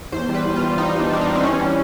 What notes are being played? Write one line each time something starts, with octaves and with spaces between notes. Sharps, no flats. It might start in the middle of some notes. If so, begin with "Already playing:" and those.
E2 C5
G3
B4
E2
F4
G3
G3 D#4
E2
D4
G3 D4
D#4
G3
C4
E3 C#4
G3